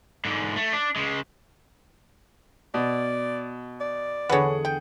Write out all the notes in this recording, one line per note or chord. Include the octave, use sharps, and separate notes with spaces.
G#2 D3
A3
D4
C#3 G#3
B2 D5
D5
E2 D3 G#4 B4 C#5 F#5
G5